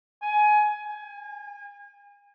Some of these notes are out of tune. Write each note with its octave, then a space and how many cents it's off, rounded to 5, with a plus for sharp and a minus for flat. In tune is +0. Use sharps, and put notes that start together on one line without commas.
G#5 +20
G#5 -35